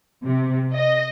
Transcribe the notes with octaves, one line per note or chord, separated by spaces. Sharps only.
C3
D#5